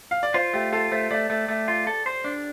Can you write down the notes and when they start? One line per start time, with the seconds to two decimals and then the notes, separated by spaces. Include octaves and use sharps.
0.11 F5
0.23 D5
0.34 F4 C5
0.53 A3 G4
0.73 F4 A4
0.92 A3 C5
1.11 A3 D5
1.30 A3
1.48 A3
1.68 F4
1.87 A4
2.06 C5
2.24 D4